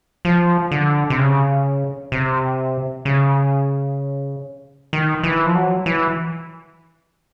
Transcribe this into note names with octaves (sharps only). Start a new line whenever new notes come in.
F3
D3
C3
C#3
C3
C#3
D#3
E3
F3
F#3
E3